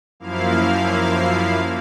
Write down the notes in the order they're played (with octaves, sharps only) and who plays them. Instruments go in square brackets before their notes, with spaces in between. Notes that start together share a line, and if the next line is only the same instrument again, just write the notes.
[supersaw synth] F#2 F3 A#3 E4 F5